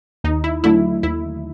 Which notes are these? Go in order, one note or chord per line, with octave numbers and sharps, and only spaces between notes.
D#2 D#4
E4
D3 F#3 A3 E4
D#2 E4